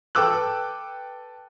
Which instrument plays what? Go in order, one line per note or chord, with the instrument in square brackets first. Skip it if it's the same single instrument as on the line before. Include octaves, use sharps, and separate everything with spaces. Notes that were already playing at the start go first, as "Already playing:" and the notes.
[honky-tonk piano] A4 B4 G5 D6 E6 F#6